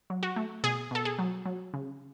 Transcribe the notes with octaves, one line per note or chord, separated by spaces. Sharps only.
F#3
F#4
A3
B2 G#4
B2 A4
G#4
F#3
F#3
C#3